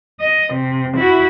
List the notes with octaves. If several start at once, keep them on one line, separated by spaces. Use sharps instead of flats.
D#5
C3
E4 F#4